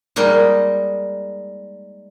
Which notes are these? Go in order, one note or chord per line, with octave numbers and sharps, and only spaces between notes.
G3 G#3 A#3 D#4